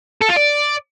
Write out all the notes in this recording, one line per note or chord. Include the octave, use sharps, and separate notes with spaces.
A4
F4
D5